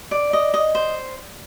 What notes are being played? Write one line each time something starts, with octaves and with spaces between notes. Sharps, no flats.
D5
D#5
D#5
C5